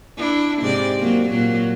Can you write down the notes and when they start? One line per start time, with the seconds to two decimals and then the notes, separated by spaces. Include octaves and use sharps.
0.18 D4 E4
0.61 G#2 C3 D5
0.98 F#3 A#3
1.28 A#2 F#3